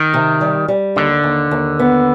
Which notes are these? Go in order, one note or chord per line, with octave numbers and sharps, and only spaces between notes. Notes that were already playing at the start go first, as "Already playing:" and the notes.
Already playing: D#3
C3
G3
G3
D#2 D3
D#2
D#2
B3